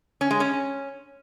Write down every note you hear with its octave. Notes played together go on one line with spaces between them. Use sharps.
C#4
G#3
C#4